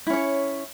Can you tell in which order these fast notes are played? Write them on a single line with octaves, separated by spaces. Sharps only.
E4 C#4 C#5